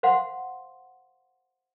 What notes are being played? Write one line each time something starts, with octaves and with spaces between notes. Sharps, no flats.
C5 F5 F#5 C6